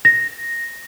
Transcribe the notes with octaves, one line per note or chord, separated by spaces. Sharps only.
A#6